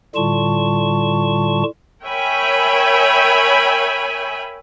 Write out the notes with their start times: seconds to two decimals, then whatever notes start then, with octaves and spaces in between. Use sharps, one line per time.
0.15 A2 D3 G3 F4 A5 C#6
2.05 A#4 C#5 E5 G5 G#5 B5